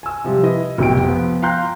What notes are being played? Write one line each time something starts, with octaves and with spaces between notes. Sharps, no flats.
G#5 E6
C3 F3 G3
E4 B4 D#5
F1 B1 G5 D7
F3 B3
F5 G5 A#5 C6 F#6 G6